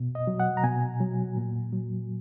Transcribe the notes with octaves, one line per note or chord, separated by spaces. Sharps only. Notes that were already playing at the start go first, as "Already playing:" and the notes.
Already playing: B2
D#5
F#3
F#5
A#5
B2 G#5
F#3
A#2
F#3